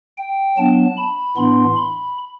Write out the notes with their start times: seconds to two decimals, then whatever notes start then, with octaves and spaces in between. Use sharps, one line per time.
0.18 G5
0.57 F#3 B3 D4 A5
0.97 B5
1.37 A2 E3 B3 D4 C6
1.76 B5